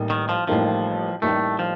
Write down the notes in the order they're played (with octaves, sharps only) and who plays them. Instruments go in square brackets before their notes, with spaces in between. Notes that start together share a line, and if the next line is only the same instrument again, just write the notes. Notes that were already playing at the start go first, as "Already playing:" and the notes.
Already playing: [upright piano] A1 A2 G3 A#3 D#4
[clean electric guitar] D#3
F3
[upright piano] A1 A2 G3 A#3 D#4 [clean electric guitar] F3
[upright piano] A1 A2 G3 A#3 D#4 [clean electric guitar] A3
[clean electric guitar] F3